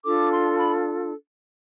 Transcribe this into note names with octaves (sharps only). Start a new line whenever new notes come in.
D4 F4 A4 D6
C6
B5